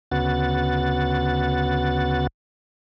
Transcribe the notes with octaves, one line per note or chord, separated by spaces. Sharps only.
D2 C#3 B3 F#4 F#5 A6